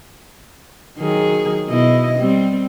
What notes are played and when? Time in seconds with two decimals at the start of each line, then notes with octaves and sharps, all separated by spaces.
0.98 D#3 F#3 G#4
1.69 B2 E4 D#5
2.19 G3 C4